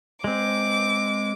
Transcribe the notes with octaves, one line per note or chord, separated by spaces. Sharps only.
G#3 C4 D6